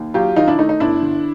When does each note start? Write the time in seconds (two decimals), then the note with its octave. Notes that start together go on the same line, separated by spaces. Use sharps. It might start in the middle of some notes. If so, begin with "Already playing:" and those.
Already playing: D#2
0.14 F#3 F4 G4
0.36 D#3 D#4 F4
0.48 D4 E4
0.58 A3 D#4
0.69 D#4
0.80 G1 D4 E4
1.02 D3